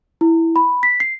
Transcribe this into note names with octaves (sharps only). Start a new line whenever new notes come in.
E4
B5
B6
C7